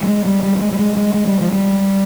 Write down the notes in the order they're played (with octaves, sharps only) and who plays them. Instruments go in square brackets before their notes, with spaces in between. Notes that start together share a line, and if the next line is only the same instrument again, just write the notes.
[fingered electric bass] G3
G#3
G3
G3
G3
G#3
G3
G#3
G#3
G#3
G3
F3
G3